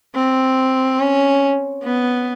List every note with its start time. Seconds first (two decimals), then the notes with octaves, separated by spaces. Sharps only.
0.16 C4
1.00 C#4
1.84 B3